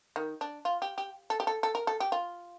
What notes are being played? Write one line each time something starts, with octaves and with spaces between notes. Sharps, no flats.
D#3
D4
F4
G4
G4
A4
G4
A4
A4
A#4
A4
G4
F4